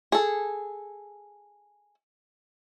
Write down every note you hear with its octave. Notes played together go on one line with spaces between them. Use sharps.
G#4 A4